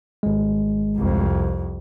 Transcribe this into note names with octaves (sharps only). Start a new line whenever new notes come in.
G#1 G#3
C2 F2